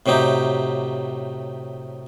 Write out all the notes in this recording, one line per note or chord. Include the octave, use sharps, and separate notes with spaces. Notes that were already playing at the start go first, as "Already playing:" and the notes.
A2 C3 F#3 D#4 G4